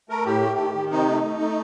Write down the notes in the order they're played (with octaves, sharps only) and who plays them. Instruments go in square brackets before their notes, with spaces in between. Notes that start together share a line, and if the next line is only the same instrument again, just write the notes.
[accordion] A3 A#4
A2 G4
A3
D#3
D#3
C3 D#4
A3
A3
A3